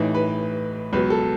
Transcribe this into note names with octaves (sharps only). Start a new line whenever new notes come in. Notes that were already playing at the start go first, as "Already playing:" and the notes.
Already playing: A1 A2 E3 D#4
B4
C#2 B2 F#3 B4
A4